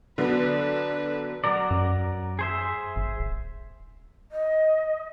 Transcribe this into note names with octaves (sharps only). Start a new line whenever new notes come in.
D3 F#3 B3 D4 B4
F#3 A#4 D5
F#2
G#4 C5 E5
G#1
D1
D#5